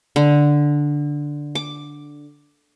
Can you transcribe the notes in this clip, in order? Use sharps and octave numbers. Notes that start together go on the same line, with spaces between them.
D3
D6